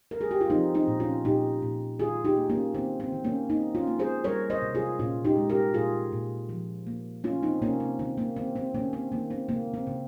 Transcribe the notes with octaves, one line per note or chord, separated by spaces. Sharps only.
A#4
G#4
G4
F4
F3 C4 D#4
C4 D#4
A#2
C#4 F4
A#2 D#4 G4
A#2
D#3 F4 G#4
D#4 G4
A#3
A#3 C#4
D#3 C4
C4
D#3
A#3 C#4
A#3 C4 D#4
C#4 F4
A#3
G#4 C5
G3 A#4 C#5
C5 D#5
C3
F4 G#4
A#2 C#4 F4
D#4 G4
G#3
G4 A#4
A#2 F4 G#4
A#2
F3
A#3
A#3 C#4 F4
C4 D#4
C3 A#3 C#4
C4
D#3 C4
A#3
D#3 C4
C4
D#3 A#3 C#4
C4
D#3 A#3
C4
C#3 A#3
C4
C#3